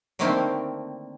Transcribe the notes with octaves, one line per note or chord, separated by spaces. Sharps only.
D3 D#3 A3 A#3 C4